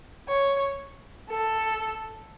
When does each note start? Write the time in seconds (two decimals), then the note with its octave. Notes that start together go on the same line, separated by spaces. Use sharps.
0.28 C#5
1.29 A4